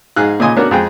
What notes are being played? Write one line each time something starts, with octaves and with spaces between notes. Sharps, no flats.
G#2 D#4 G#4 F5 F#6
A#2 C#3 D#5 G#5 C6 D#6
A3 B3 C#4 D4 F#4 A#4
F2 G#3 G#4 G5